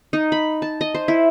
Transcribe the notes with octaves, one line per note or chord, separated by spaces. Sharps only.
D#4
B5
A5
D#5
C5
E4